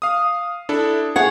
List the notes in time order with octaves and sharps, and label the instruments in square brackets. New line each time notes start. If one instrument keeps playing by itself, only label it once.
[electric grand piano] F5 D#6
D4 E4 A4
[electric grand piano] G#4 [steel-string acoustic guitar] C#5 F#5